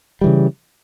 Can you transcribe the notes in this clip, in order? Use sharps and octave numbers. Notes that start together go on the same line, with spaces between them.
C#3 E3 G3